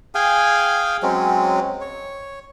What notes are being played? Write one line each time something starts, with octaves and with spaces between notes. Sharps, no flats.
G#4 F5 G5 G#5
F#3 G#3 C4 C#4
C#5